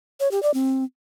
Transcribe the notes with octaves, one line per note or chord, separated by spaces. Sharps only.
C#5
G4
D5
C4